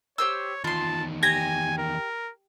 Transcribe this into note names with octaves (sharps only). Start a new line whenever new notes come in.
G4 C5 C#5 E6
E2 D#3 F4 A5 C6
G4 G#5 G#6 A#6
A#4